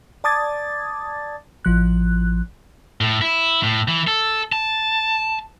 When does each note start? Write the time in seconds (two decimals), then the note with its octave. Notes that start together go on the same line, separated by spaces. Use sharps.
0.24 D5 A5 D6 D#6 G#6 A6
1.65 A1 F3 F#6
3.01 A2
3.21 E4
3.63 A2
3.88 E3
4.07 A4
4.52 A5